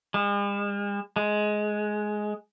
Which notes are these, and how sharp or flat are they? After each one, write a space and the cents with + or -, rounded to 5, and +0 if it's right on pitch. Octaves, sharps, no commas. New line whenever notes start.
G#3 -45
G#3 +15